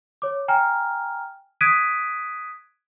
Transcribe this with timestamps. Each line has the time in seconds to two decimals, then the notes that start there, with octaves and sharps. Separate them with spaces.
0.22 C#5 D6
0.48 G5 G#5 A#5 F6
1.61 D#6 F#6 G#6 B6 D7 D#7